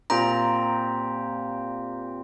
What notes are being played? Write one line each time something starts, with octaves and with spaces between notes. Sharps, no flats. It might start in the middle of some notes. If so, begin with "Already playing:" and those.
A#2 C4 G4 A#5